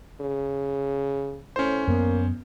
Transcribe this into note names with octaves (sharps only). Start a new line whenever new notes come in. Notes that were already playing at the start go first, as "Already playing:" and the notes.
C#3
A2 C#4 C5
F#2 A#3 B3